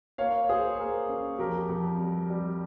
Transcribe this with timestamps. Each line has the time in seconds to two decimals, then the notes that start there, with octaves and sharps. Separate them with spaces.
0.18 A#3 C#5 F5
0.49 A#3 G#4 C5
0.79 A#3
1.09 C#4
1.38 F2 G4 A#4
1.69 F2
1.99 G3
2.30 G3